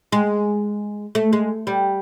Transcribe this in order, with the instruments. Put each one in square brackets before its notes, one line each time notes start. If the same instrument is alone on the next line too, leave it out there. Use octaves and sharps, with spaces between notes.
[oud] G#3
A3
G#3
G3